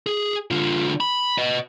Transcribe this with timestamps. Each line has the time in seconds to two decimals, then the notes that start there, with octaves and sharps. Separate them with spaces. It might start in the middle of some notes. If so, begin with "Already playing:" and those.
0.07 G#4
0.51 D3 F4
1.00 B5
1.38 B4 D#5